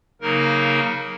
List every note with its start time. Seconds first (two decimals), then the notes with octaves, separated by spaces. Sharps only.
0.21 C#3 F#3 A#3 D#4 A#4